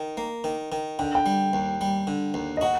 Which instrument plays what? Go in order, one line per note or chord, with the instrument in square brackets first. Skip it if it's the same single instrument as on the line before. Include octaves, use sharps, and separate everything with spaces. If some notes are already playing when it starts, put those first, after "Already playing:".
Already playing: [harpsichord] D#3
A#3
D#3
D#3
[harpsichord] D3 [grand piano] G5
[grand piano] G5
[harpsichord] G3
D#2
G3
D3
D#2
[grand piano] D#5
[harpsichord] F#4 [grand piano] F#5